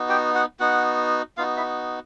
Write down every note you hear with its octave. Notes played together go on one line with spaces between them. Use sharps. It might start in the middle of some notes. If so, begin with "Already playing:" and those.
Already playing: B3 D#4 F#4
G4 G5
F#4 F#5
B3 D#4 F#4 F#5
B3 D#4 F4 F#4 F5
E4 E5